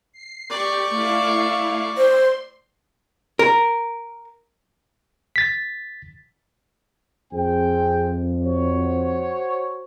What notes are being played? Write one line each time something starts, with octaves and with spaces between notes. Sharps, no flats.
C7
G4 D5 C#6
A3 E4 F5
C5 C6
A#4
A6 B6
F2 C4 G#4 G5
F#4 C5 C#5